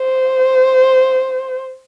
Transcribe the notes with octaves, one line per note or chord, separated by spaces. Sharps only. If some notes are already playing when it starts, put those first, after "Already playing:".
Already playing: C5